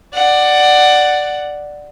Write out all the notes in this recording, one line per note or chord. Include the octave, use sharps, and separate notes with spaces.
D5 F#5